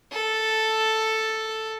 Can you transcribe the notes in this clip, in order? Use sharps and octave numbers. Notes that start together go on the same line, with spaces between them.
A4